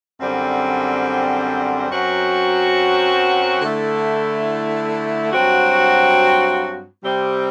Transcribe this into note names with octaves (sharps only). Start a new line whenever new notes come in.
F#2 D3 G3 C4
F#2 F#3 C4 F#4
D3 A3 E4
G2 F#3 C4 F#4
C3 G3 C4